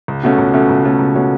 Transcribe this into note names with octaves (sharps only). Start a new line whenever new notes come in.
C#2
B2 A3 C#4
C#2
B2 A3 C#4
C#2
B2 A3 C#4
C#2
B2 A3 C#4